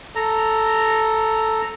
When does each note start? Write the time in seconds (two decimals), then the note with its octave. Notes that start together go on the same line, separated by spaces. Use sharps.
0.15 A4 A#5